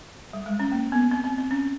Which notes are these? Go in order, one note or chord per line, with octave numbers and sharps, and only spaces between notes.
G3
G#3
C#4
A#3
B3
C4
C4
C4
C#4